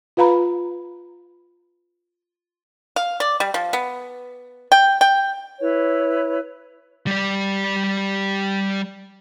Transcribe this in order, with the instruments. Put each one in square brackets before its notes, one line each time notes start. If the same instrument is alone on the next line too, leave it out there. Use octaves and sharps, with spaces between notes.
[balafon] F4 B4 F5 A#5 B5
[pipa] F5
D5
G3
F3
B3
G5
G5
[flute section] E4 B4 C#5
[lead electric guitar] G3 D5